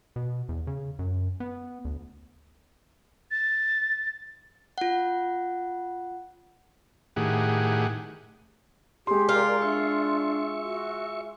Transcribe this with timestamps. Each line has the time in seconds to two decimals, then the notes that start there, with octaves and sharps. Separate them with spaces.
0.16 B2
0.49 E2
0.67 C#3
0.99 F#2
1.40 B3
1.85 D2
3.31 A6
4.78 F4 F#5
7.16 A2 D#3 G4 G#4 F#5
9.07 G#3 G4 C6
9.29 F4 A#4 D5
9.62 D4 E5 C#6
10.64 F#4